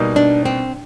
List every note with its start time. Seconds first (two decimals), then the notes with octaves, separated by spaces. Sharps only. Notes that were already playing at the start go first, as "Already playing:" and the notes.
Already playing: B2 G3 A#3 D#4
0.16 D4
0.45 C4